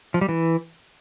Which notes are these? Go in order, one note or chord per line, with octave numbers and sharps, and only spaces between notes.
F3
G3
E3